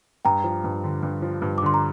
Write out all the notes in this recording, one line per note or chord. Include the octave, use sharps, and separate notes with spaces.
G2 G5 A#5
F3
G2
D3
G2
F3
G2
D6
D3 C6
A#5